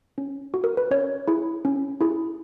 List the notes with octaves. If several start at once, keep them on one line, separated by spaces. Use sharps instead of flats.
C#4
F#4
A#4
B4
C#4 C#5
E4 G#4
C#4
E4 G#4